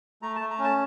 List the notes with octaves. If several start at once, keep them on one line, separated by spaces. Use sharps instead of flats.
A3 A#5
A3 A5
A#5
C#4
A5